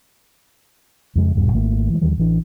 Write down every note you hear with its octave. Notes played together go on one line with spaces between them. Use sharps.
F2 C#3 G#3
D#1 G2 B2 G3
G#1 D#3 A3 A#3
E3 G#3
D#2 D#3 E3 G3
A1 E3 D4